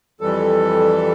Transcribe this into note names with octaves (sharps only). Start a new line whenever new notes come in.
F2 E3 G3 A4